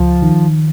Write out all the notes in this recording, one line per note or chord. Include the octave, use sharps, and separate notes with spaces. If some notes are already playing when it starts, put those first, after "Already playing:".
Already playing: C#2 F3
D#3